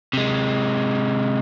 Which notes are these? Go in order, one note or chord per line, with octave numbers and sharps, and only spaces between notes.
C3 G#3